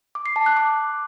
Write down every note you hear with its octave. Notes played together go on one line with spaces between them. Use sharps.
D6
C7
A5
F#6
D6